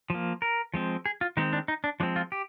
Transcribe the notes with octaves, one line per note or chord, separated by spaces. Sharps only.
F3 A#3
A#4
F3 G#3 C4
G#4
F4
D#3 G#3 C4 D#4
D4
D#4
D4
F3 G#3 C4 D4
F4
G4